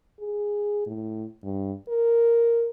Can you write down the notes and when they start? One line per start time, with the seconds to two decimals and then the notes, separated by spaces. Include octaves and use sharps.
0.20 G#4
0.86 A2
1.43 G2
1.88 A#4